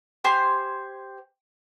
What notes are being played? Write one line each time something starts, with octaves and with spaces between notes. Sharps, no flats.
G4 C5 G#5 C6